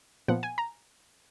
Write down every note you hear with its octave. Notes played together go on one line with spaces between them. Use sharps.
A#2 F3 B3 F#5
G#5
A#5